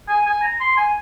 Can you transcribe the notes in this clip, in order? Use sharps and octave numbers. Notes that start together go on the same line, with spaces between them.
G#5
G#5
A#5
C6
G#5